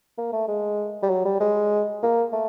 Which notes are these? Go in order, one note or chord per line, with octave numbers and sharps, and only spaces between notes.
A#3
A3
G#3
G3
F#3
G3
G#3
A#3
A3